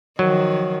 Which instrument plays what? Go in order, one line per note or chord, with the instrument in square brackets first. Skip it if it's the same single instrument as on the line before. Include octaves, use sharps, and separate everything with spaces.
[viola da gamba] D#3 F3 [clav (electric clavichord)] F#3